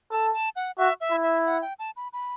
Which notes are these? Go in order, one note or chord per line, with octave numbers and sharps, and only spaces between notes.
A4 A5
A5
F#5
F#4 E5
E5
E4
E5
F#5
G5
A5
B5
B5